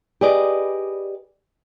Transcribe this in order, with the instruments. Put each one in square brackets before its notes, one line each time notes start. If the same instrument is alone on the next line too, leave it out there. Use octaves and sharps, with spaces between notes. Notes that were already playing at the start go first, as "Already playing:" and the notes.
[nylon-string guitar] G4 G#4 B4 D5 D#5